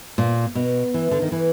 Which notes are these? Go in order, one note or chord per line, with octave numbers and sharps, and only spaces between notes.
A#2
B2
E3
D3
D#3
E3